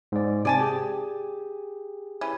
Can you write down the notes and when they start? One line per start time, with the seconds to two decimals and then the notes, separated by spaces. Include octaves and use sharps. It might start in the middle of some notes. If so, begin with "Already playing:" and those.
0.12 G#2 D5
0.45 C3 C4 D5 G#5 A5
0.59 G4 G#4
2.21 E3 C#4